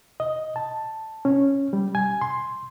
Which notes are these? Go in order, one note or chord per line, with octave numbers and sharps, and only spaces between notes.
D#5
A5
C#4
G3
G#5
C6